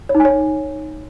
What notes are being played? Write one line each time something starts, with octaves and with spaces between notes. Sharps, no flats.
C#5
D#4
G#5
C#5